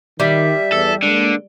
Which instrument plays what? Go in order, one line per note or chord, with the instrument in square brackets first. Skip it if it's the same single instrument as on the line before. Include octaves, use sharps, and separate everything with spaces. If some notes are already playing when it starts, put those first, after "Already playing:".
[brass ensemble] D#3 [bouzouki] G3 [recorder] E5
[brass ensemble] E2 [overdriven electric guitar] A4
[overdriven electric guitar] D3 [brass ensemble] G#3 A#3